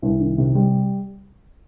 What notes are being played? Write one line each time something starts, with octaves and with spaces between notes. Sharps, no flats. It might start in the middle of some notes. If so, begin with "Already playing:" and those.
C2
D#3
C3
G3